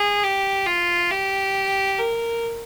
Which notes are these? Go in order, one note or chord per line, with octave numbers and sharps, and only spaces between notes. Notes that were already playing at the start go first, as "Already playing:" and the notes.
Already playing: G#4
G4
F4
G4
A#4